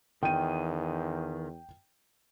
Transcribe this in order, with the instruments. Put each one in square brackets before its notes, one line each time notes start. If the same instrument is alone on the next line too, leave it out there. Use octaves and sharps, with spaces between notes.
[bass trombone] E2 [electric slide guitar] D#3 [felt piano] G5 D#7